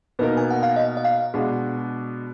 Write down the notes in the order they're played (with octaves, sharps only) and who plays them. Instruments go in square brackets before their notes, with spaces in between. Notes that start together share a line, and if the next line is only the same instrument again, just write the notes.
[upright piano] B2 A#3 D#4 A#4 [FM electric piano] B4
[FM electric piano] G#5
F#5
F5
D#5
D#5
F5
[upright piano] B2 G#3 D4 F#4